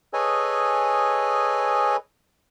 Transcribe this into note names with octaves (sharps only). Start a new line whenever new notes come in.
G#4 A4 B4 C#5 D#5 G#5